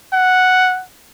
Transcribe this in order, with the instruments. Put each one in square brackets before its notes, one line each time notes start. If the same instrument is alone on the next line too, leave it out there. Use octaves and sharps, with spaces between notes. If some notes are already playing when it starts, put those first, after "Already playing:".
[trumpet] F#5